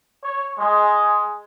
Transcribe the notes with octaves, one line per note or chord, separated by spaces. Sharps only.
C#5
G#3